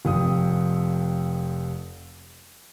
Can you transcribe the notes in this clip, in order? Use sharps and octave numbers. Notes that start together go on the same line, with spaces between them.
F1 F2 D#6